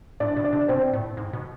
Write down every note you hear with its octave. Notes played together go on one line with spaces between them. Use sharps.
A2 D4 D5
B2
D4 D5
C3
B2 C4 C5
A2
G#2
B2